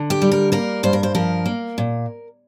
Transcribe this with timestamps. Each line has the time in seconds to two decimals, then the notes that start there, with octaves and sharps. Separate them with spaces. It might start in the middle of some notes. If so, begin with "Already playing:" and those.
Already playing: D3
0.10 G4
0.22 G3
0.32 A#4
0.52 A#3 A#4
0.83 G2 C5
0.93 A#4
1.03 C5
1.15 F3 A#4
1.46 A#3
1.78 A#2